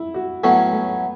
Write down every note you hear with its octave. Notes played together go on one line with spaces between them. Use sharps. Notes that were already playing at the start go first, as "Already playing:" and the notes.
Already playing: E4
F#4
A2 F#3 B3 C#4
A3